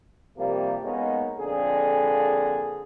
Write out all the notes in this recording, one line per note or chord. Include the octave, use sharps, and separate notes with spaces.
C3 F3 G3 A#3
G#3 A#3 B3 C#4 D#4
F2 A#2 D3 G#4